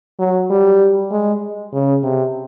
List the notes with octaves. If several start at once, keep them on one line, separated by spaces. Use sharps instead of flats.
F#3
G3
G#3
C#3
C3